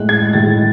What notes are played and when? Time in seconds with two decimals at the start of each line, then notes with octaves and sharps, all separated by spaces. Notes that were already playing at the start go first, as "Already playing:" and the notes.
Already playing: A2 G#3 F#6
0.09 G#6
0.33 A2 G#3 A6